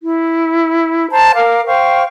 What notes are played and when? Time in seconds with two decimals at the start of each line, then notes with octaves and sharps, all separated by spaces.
0.02 E4
1.11 C5 A5 A#5
1.36 A#4 F5 D6
1.66 C5 F5 G5 C#6